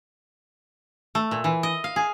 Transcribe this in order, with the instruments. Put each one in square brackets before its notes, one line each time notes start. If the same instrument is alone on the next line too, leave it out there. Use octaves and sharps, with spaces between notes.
[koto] A3
A#2
E3
D#5
F5
G#4